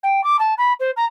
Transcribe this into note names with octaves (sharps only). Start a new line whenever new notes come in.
G5
D6
A5
B5
C5
A#5